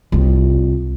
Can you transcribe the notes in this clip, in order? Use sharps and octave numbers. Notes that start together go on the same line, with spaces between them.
C2 F4